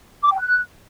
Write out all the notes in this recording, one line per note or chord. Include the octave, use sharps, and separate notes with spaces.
D6
G5
F#6